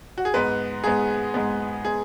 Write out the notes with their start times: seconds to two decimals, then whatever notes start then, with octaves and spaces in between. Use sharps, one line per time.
0.18 F#4
0.25 G#4
0.34 G#2 G#3 B3 B4
0.84 G#2 G#3 B3 G#4
1.34 G#2 G#3 B3
1.85 G#3 B3 G#4